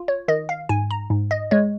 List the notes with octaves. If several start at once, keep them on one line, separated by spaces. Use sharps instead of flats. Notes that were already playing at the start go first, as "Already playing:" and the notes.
Already playing: F4
C#5
D#3 D#5
F5
G#2 G#5
A#5
G#2
D#5
G#3 C#5